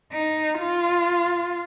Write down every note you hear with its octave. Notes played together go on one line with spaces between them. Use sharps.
D#4
F4